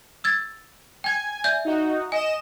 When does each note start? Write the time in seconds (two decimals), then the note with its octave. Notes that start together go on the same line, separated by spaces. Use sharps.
0.24 E6 G#6 A6
1.04 G5 G#5 G#6
1.44 D5 E5 G6
1.65 D#4 F#4
2.12 D#5 G#5 E7